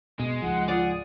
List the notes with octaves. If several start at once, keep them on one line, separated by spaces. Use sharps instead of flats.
B2 G#3
C#2 G#2 F3 F#5
F4 G#4 D5 F#5 D6